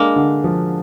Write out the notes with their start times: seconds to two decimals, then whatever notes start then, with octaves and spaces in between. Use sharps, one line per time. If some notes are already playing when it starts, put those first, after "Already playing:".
Already playing: G#3 A#3 D4
0.16 D3
0.44 F3